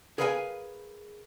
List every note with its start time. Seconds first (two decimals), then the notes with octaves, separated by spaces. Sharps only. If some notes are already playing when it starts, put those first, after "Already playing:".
0.18 G#4 A#4 B4 F5 F#5 G#5